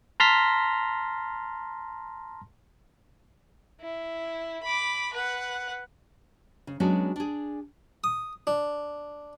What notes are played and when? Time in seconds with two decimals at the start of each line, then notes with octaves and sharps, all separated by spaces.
0.20 A5 A#5 C6 F6 A#6 B6
3.81 E4
4.63 B5 D6
5.13 B4 F#5
6.67 C#3
6.80 F#3 G#3 B3 C#4 D4 F#4
7.16 D4 G#4
8.04 D#6
8.47 D4